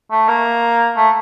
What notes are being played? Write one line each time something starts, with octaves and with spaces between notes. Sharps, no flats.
A3
A#3
A3